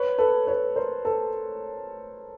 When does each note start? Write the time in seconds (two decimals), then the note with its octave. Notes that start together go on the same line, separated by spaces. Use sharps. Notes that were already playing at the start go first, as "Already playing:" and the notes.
Already playing: B4 C#5
0.18 A4 B4
0.47 B4 C#5
0.76 A#4 C5
1.05 A4 B4